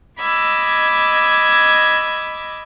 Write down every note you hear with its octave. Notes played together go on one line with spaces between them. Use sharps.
D#5 B5 D6 E6 G#6